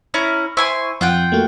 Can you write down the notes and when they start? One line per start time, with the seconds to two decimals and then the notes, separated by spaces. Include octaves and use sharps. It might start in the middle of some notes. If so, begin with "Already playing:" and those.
0.14 C#4 E4 A#5
0.57 E4 C5 G#5 C6 C#6
1.01 F2 F4 F#5 G5
1.32 A3 A#3 F#4